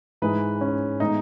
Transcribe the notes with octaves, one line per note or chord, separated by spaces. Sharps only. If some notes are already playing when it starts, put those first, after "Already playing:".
G#2 E3 G#3 B4
C#4
A2 E3 G#3 B3 D#4